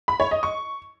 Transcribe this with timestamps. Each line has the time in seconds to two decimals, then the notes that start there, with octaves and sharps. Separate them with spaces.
0.08 B5
0.20 C#5
0.31 D#5
0.43 C#6